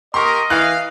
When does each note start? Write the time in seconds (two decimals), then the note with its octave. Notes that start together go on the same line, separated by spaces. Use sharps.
0.14 A#3 G4 A#4 D#5 C6 C#6
0.50 E3 F5 F#6